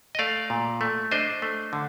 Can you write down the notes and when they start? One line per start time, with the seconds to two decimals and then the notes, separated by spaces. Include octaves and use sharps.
0.15 D#5
0.19 A3 D5 F5
0.50 A#2
0.81 A3
1.11 D4 C5 D#5
1.42 A3
1.73 D3